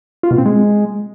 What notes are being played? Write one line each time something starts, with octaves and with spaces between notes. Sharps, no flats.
F4
B2
C4
G#3